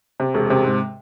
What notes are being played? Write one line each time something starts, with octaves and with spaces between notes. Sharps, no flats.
C3
E1
C3
G#2